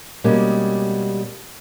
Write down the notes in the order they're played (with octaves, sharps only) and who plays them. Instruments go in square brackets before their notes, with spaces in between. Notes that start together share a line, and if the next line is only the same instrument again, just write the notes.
[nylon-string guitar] B2 G3 G#3 A#3 C#4